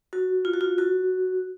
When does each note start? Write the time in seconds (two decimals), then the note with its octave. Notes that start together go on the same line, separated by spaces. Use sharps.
0.13 F#4
0.45 F4
0.53 F#4
0.61 F4
0.78 F#4